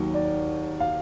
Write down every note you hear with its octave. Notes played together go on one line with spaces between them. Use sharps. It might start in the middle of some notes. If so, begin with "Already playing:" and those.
Already playing: D#2 D#3 F#3
D5
F5